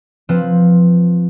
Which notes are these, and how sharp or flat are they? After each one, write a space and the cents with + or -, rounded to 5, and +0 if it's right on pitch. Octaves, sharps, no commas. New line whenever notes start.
F3 +5 C4 +0 B4 +0